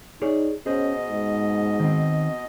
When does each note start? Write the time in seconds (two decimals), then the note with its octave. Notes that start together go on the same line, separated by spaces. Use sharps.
0.22 D#4 G#4 C#5 D5
0.66 B2 C#4 G#4 C5 D#5
1.10 G#2
1.80 D#3 C4